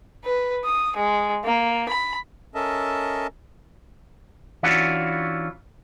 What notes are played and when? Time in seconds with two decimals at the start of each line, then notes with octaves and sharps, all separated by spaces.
0.24 B4
0.65 D#6
0.96 G#3
1.44 A#3
1.89 B5
2.55 C#4 A4 A#4 D#5 E5 A5
4.63 E3 C#4 D4 F4 F#4